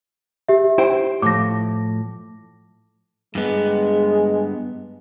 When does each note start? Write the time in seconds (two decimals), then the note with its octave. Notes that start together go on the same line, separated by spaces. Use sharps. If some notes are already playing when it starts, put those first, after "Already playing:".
0.48 G4 E5
0.78 E4 C5 G5
1.22 A2 F3 D6 A#6
3.35 G2 G#3 B3